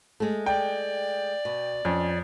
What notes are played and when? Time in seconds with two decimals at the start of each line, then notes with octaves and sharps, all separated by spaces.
0.20 G#3 A3
0.46 D5 G5
1.45 B2
1.85 F2 C#4